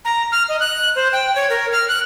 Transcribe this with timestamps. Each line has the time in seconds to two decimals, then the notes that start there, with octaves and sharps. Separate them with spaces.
0.05 A#5
0.32 F6
0.49 D#5
0.60 F#6
0.96 C5
1.13 G5
1.36 C#5
1.50 A#4
1.72 F6
1.88 F#6